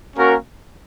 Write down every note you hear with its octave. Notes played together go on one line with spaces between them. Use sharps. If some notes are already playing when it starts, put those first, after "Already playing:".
A#3 C#4 F#4 A#4